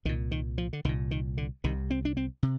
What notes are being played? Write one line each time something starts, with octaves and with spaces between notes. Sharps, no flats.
C2 A#2 D#3
D#3
F3
D3
C2 A#2 D#3
D#3
D3
C2 C3 D#3
C4
D4
C4
C3